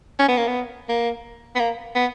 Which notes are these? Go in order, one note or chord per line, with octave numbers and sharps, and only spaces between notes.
C#4
B3
A#3
B3
A#3
B3
A#3
B3